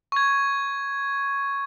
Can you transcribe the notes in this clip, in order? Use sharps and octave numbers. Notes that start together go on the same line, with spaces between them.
C#6 G#6